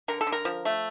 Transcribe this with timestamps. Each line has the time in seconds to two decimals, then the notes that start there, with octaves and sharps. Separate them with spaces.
0.08 D3 A#4
0.21 A4
0.27 D3
0.32 A#4
0.45 F3
0.65 A3